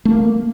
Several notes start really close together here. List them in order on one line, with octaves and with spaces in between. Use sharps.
A3 C#4 A#3